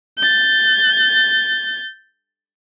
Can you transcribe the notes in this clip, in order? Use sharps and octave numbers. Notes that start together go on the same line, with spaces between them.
G6 A6